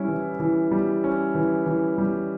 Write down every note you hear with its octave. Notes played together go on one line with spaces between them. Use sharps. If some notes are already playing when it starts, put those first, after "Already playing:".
Already playing: G3 C#4 E4
E3
E3
G3
C#4
E3
E3
G3